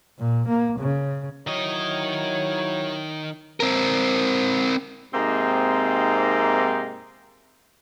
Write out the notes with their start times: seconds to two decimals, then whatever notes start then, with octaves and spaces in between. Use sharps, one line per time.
0.18 A#2
0.48 A#3
0.80 C#3
1.47 D#3 F#3 E4 C#5 D#5
3.60 C4 A#4
5.13 G#2 C3 A#3 C4 D#4